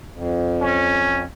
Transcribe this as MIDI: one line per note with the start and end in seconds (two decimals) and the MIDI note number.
0.14 1.24 41
0.61 1.23 61